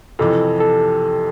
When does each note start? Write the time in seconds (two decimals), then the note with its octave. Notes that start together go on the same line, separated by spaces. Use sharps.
0.19 F2 C3 E3 A4
0.60 A4